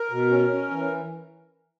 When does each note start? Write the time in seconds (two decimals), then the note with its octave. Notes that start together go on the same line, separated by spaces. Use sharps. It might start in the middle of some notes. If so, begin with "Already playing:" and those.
Already playing: A#4
0.11 B2
0.31 C#4
0.51 C#4
0.71 E3